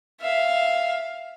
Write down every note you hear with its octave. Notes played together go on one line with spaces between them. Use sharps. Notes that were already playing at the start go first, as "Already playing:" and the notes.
E5 F5